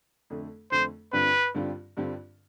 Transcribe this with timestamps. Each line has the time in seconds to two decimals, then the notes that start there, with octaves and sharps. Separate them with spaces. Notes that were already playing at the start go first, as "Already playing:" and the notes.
0.30 F2 D3 A3
0.71 F2 D3 A3 C5
1.13 G2 D3 G3 C4 F4 B4
1.54 G2 D3 G3 C4 F4
1.97 G2 D3 G3 C4 F4